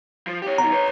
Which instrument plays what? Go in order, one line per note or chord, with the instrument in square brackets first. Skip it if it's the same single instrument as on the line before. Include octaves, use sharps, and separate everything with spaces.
[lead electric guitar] F3
G4 C#5
[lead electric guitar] B2 D#3 [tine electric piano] A#5
[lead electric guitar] B4 C#5